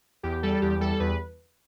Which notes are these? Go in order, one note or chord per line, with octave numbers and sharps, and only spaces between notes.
E2 G4
G3 A4
E2 G4
G3 A4
E2 B4